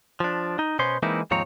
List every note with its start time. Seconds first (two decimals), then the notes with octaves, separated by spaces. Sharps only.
0.20 F3 D4
0.59 D#4
0.79 B2 B3 C#4 C5 C6
1.03 E3 G#3 A#3 C4 D#4 E4
1.31 D#2 G#2 F3 C4 C#5 A#5